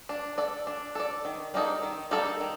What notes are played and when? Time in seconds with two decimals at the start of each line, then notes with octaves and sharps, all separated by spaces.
0.09 D4
0.38 A4 D5
0.67 D4
0.95 A4 D5
1.25 D#3
1.54 G3 A#3 D#4 A4
1.82 D#3
2.11 G3 A#3 D#4 A4
2.40 D#3